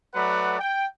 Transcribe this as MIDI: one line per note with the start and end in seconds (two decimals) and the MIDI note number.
0.14 0.58 54
0.14 0.58 57
0.14 0.58 71
0.14 0.58 74
0.14 0.58 78
0.14 0.58 83
0.59 0.87 79